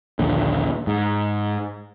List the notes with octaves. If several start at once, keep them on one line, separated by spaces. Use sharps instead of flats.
A#1 D#2 D3
G#2